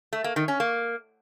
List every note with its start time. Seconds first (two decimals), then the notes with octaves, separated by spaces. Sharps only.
0.13 A3
0.24 A#3
0.36 D#3
0.48 C#4
0.60 A#3